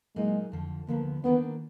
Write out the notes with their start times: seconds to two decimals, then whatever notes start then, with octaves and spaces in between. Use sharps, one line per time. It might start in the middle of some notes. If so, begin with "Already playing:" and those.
0.16 A#2 F#3 G#3 A#3 D#4
0.52 F2 D3 F3
0.87 D2 D3 F3 A#3 B3
1.24 D#3 A#3 B3 D4